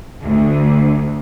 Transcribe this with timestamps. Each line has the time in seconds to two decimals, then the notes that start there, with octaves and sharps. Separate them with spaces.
0.23 D2